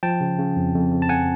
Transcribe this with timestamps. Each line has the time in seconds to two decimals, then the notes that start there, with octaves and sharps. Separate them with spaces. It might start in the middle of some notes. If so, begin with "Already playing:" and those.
0.03 F3 G5 A5
0.21 C#3
0.39 C#3
0.56 F2
0.75 F2
0.92 F2
1.02 A5
1.09 F2 F#5 G#5